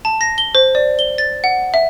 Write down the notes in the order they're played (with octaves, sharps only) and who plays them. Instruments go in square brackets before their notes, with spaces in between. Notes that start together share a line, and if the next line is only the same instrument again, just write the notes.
[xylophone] A5
A#6
G7
C5
D5
G7
A6
F#5
E5